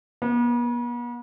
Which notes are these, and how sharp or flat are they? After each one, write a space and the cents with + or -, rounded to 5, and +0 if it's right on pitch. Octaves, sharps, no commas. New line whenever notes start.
B3 -45